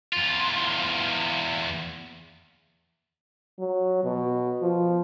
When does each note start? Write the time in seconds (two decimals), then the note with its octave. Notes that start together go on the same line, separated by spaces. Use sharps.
0.13 E2 F4
3.59 F#3
4.04 B2
4.62 F3